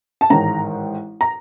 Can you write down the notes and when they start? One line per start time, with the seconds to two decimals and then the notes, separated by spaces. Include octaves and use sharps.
0.21 A5
0.30 A1 G#2 D#3 A#5
1.21 A#5